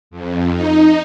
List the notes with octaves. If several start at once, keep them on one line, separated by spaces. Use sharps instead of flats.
F2
D#4